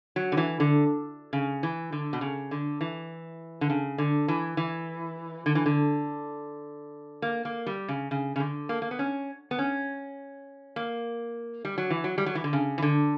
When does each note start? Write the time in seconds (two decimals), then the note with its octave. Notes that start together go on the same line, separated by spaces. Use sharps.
0.16 F#3
0.32 D3
0.37 E3
0.60 D3
1.33 C#3
1.63 E3
1.92 D3
2.13 B2
2.21 C#3
2.51 D3
2.81 E3
3.61 D3
3.70 C#3
3.98 D3
4.28 E3
4.57 E3
5.46 D3
5.55 E3
5.66 D3
7.22 A#3
7.45 A#3
7.66 G3
7.88 C#3
8.11 C#3
8.36 C#3
8.40 D3
8.69 A#3
8.82 A#3
8.91 B3
8.99 C#4
9.51 B3
9.59 C#4
10.76 A#3
11.65 G3
11.78 F#3
11.90 E3
12.04 F#3
12.18 G3
12.26 F#3
12.35 E3
12.44 D3
12.53 C#3
12.78 E3
12.82 D3